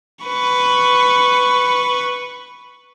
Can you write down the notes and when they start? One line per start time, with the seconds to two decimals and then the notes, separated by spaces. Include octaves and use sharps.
0.25 B4 C#6